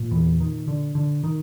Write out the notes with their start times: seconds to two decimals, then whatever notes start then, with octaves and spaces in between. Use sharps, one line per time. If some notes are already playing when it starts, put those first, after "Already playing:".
Already playing: A#2
0.11 E2 E3
0.40 D#3
0.68 D3
0.95 D3
1.24 D#3